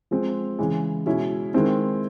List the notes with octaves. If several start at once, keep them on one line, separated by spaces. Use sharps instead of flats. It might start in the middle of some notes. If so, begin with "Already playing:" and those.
F3 G#3 C4
C#3 E3 G#3
B2 G#3 C#4 E4
D#3 G#3 C4 E4